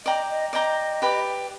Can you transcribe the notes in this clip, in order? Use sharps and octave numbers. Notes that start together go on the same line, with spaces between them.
D5 D#5 G5 A#5
D#5
D5 D#5 G5 A#5
G4 B4 D5